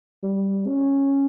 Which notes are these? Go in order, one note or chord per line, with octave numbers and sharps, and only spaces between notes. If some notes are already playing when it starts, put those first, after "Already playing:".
G3
C#4